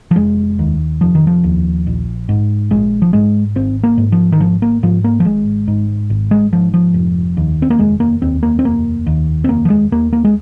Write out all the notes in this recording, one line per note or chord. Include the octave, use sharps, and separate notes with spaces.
F3
F1 G#3
D#2
F1 F3
D#3
F3
D#2
A#1
G#2
A#1 G#3
F3
G#2 G#3
G#1 C4
A#3
G#2
F3
D#3
G#1 F3
A#3
G#2 F3
A#3
F3
G#1 G#3
G#2
G#1
G#3
G#2 F3
F3
F1
D#2
C4
A#3
F1 G#3
A#3
D#2 C4
A#3
C4
F1 A#3
D#2
C4
F1 A#3
F3
G#3
D#2 A#3
A#3
G#3